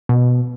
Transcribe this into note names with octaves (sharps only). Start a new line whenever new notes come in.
B2